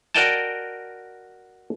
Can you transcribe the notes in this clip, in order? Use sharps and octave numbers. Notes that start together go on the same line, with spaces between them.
F#4 A#4 D5 D#5 G5 A5